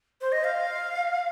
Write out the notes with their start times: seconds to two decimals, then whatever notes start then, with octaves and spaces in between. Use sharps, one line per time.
0.21 C5
0.32 D#5
0.44 F5